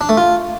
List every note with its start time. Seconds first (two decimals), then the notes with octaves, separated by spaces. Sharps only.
0.01 D4
0.09 A3
0.17 F4